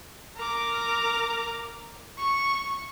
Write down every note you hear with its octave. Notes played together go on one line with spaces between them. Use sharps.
A#4 D6
C#6